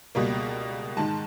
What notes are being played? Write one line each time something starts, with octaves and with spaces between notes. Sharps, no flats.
C#2 B2 G3 A#3
G#2 D#3 G#3 A5